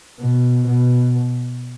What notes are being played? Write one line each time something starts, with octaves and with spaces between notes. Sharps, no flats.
B2
B2